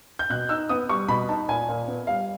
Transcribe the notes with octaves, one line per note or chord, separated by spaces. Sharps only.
G6
B2 F#6
D#4 E6
B3 D#6
G3 C#6
B2 B5
D#4 A5
A#2 G#5
A#2
B3
G3 F5